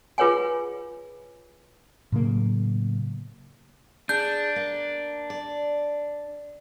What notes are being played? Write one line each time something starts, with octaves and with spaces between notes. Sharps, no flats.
F4 G#4 B4 C#5 F#5 G#5
A2 C#3 F#3 A#3
D4 G#4 G6
A#3
D5